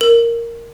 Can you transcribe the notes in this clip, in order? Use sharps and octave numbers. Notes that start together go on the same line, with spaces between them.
A#4